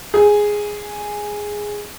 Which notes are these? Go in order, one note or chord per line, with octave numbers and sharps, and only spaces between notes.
G#4